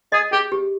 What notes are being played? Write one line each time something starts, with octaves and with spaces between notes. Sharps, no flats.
G#4 D#5
G4 G#4
G4